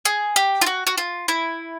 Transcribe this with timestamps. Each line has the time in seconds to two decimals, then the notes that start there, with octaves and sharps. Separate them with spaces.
0.05 G#4
0.36 G4
0.61 F4
0.66 F#4
0.87 F#4
0.97 F4
1.28 E4